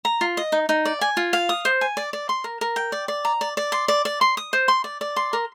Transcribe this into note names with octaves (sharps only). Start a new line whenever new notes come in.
A#5
F4
D#5
D#4
D#4
D5
G#5
F4
F5
D#6
C5
G#5
D5
D5
C6
A#4
A#4
G5
D5
D5
A#5
D5
D5
C6
D5
D5
C6
D#6
C5
C6
D5
D5
C6
A#4